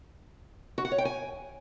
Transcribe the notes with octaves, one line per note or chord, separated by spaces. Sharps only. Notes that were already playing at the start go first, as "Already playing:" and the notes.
F#4
F#5
C#5
G5
G#5